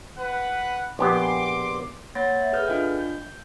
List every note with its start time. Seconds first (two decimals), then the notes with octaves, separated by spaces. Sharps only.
0.17 B4 F#5
0.99 A#1 B3 G4 C6 D6
2.15 A#3 C#5 F#5 B5 A6 A#6
2.41 E5
2.53 G#4 A4 B4 D#6 F6 G6
2.68 D4 F4 D#5 F5 G5
2.98 G6